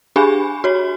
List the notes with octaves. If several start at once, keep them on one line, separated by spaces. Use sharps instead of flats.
D4 G4 G#4 G#5 B5
F#4 C#5